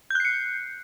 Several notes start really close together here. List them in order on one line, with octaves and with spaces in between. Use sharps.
G6 F#6 C7 C#7